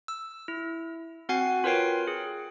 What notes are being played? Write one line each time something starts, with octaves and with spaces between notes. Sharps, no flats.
E6
E4
C4 F#4 F#5 G#5 C7
F4 A#4 B4 C#5 G5 C7
G#4